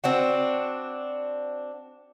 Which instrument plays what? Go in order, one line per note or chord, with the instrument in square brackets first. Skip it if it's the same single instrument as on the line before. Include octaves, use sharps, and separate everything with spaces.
[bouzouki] C4 D4 F#4